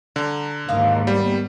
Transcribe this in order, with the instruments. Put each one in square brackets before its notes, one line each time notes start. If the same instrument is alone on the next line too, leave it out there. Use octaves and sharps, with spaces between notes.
[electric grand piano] D3 [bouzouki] G3 A#5
[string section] D#2 G#2 [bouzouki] A#3 D#4 F5
[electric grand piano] G3 [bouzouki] B3